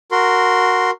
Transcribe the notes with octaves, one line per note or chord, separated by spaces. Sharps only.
F#4 A#4 C6